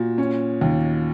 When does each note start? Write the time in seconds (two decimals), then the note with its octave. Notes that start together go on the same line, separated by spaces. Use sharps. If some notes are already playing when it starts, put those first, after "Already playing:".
Already playing: A#2 F#4
0.18 C#4
0.61 D#2